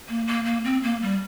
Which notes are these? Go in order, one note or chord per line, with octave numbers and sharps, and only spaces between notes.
A#3
A#3
A#3
C4
A#3
G3